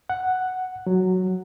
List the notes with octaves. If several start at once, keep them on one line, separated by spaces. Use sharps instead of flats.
F#5
F#3